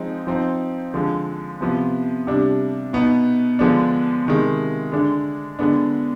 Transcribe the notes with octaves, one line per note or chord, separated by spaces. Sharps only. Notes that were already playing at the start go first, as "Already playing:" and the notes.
Already playing: F3 G#3 C4 D#4
F3 C4 D#4
D3 F3 G#3
C3 F3 B3
C3 G3 D4
B2 B3 D#4
D3 F3 G#3 B3 D4
C3 D#3 G#3
D3 G#3 D4
D3 G#3 B3 D4